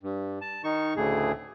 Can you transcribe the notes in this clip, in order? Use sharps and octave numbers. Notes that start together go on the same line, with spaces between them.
G2
A5
D#3 D#4 C#6
D2 A2 C#3 G#4